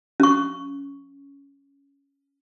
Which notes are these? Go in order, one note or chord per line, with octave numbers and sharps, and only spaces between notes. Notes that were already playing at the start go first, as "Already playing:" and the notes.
C#4 C#6